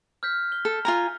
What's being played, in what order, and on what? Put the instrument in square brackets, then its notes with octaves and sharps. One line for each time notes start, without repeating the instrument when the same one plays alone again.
[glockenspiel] F6 G6 B6
G7
[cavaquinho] A4
F4 G#5 A#5